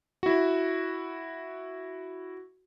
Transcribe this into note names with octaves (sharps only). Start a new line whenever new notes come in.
E4 F#4